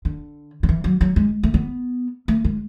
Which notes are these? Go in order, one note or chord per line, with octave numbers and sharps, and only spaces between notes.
D3
D3
E3
F#3
F#3
G#3
A3
B3
A3
G#3